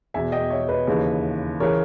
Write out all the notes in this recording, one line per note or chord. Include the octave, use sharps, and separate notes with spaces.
E2 B2 E5 G#5
D#5 G5
C#5 E5
B4 D#5
D#2 C#3 E3
C#3 E3 A#4 C#5